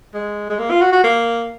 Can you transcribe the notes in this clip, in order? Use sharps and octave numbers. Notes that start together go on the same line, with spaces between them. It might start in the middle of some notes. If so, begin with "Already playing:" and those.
G#3
G#3
A#3
F4
F#4
F#4
A#3